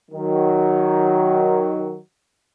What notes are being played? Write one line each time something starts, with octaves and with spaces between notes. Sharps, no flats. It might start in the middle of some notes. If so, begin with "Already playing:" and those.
D#3 F#3